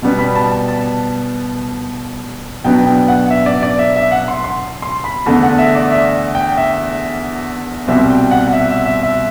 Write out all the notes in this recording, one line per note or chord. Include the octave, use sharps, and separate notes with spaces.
B2 G3 B3
B5
A5
A5
A5
B2 F#3 B3 D4 G5
G5
F#5
E5
D5
D5
E5
E5
F#5
C6
C6
C6
B5
E2 D3 A3 D4 A5
F#5
E5
D5
E5
G5
E5
C2 B2 G3 C4 E5
G5
F#5
F#5
E5
E5
E5
E5